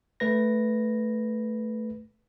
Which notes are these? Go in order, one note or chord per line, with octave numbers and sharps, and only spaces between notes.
A3 B4 A#6